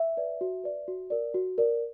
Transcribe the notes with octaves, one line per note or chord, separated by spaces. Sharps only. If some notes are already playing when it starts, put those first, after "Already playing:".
Already playing: E5
B4 D5
F#4
B4 D5
F#4
A#4 D5
F#4
A#4 D5